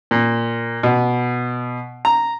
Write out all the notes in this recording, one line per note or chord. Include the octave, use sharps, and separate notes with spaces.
A#2
B2
A#5